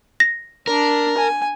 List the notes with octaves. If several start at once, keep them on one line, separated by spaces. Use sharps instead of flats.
A#6
D4 A#4
G#5